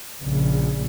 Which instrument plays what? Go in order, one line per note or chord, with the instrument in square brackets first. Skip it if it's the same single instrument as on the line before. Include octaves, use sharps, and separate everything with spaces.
[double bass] A#1 C#3